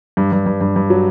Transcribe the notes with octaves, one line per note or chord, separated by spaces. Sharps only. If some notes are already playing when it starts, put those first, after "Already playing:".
G2
G2
G2
G2
G2
F#3